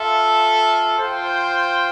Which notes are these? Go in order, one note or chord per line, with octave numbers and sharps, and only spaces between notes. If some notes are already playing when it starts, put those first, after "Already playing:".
Already playing: F4 A4 E5
F4 C5 G5